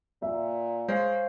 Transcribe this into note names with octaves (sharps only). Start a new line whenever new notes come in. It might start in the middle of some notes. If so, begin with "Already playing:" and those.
A#2 E5
G#3 C5 C#5 F5